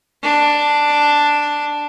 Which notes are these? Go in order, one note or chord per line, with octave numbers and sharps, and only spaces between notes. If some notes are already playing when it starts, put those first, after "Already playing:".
D4